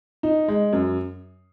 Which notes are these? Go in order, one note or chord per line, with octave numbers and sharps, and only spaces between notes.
D#4
G#3
F#2